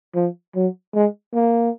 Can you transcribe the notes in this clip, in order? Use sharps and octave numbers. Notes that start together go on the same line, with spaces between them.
F3
F#3
G#3
A#3